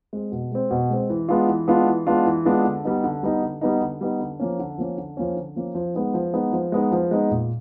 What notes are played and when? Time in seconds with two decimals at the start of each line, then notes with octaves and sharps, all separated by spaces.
0.13 G#3 C4
0.32 B2
0.51 G#3 C4
0.71 B2
0.90 G#3 C4
1.10 E3
1.29 G#3 B3 D4 F4
1.48 E3
1.68 G#3 B3 D4 F4
1.87 E3
2.07 G#3 B3 D4 F4
2.26 E3
2.45 G#3 B3 D4 F4
2.65 D3
2.84 G3 B3 D#4
3.04 D3
3.23 G3 B3 D#4
3.43 D3
3.61 G3 B3 D#4
3.81 D3
4.01 G3 B3 D#4
4.20 D3
4.39 F3 A#3 C#4
4.59 D3
4.78 F3 A#3 C#4
4.98 D3
5.17 F3 A#3 C#4
5.36 D3
5.56 F3 A#3 C#4
5.75 F3
5.94 G#3 B3 D#4
6.14 F3
6.33 G#3 B3 D#4
6.53 F3
6.72 G#3 B3 D#4
6.92 F3
7.11 G#3 B3 D#4
7.30 A#2